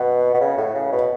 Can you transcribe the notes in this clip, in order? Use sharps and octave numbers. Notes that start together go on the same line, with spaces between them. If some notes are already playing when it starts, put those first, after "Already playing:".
Already playing: B2 F#5
B2
C#3
A2
C#3
B2